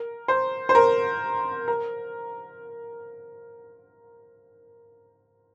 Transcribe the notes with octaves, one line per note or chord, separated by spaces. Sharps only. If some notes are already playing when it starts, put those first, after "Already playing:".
Already playing: A#4
C5
C5
A#4
A#4